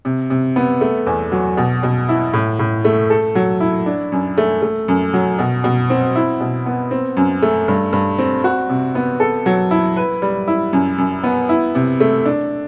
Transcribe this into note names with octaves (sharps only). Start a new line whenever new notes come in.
C3
C3
B3
A3
E2
F#3
B2
B2
E4
A2
A2
A3
A4
F#3
E4
D4
F#2
A3
A3
F#2
F#3
B2
B2
C4
E4
B2
B3
C4
F#2
A3
G2
G2
C4
F#4
C3
B3
A4
F#3
E4
B4
G3
E4
F#2
F#2
B3
E4
C3
A3
D4